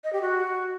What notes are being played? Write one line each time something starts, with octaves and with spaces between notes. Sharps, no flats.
D#5
G4
F#4